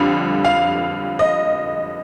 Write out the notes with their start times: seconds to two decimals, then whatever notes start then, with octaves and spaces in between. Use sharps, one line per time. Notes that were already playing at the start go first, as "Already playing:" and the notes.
Already playing: F2 D3 G3 F5
0.44 F5
1.19 D#5